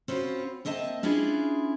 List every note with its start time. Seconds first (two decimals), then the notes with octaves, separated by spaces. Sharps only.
0.08 C4 C#4 F4 F#4 B4
0.65 A#3 C4 D#5 E5 A5
1.03 C#4 D4 E4 F4 G#4 B4